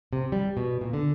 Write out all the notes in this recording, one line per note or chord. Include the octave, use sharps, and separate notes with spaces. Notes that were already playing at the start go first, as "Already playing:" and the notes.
C3
G3
B2
A#2
D3